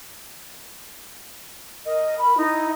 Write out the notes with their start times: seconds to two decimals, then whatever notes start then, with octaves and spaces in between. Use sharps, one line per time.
1.86 A#4 D#5
2.18 B5
2.37 D#4 E4